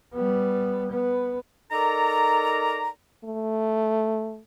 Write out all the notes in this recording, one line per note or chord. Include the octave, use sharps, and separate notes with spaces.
G3 B3
B3
D#4 A4 A#4 D5 A#5
A3